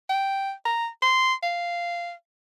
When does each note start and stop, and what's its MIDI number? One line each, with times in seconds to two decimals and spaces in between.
0.10 0.52 79
0.65 0.88 82
1.02 1.34 84
1.43 2.12 77